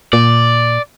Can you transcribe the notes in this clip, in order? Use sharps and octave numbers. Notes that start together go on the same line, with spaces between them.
A#2 D5